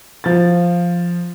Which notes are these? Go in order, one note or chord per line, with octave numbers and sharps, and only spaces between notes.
F3 A6